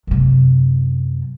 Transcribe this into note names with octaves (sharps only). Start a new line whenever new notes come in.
F#2 C3